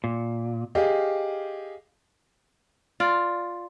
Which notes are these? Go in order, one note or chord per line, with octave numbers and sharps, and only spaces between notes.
A#2
G4 G#4 D#5 F5
F4 D5